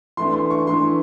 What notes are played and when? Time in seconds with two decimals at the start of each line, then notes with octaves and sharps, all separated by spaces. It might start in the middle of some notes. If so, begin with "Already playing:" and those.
0.17 E3 A3 D4 C6
0.34 C6
0.50 C#6
0.67 E3 A3 D4 C6